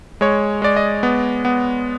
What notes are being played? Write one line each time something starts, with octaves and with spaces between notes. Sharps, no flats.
G#3 C#5
G#3 D5
D#5
B3
B3